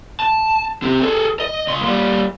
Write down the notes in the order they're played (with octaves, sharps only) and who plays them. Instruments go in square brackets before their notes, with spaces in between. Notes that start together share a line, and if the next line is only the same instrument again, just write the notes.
[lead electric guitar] A5
C4 G4
G#4 A4
D#5
C#2 C6
G3 A#3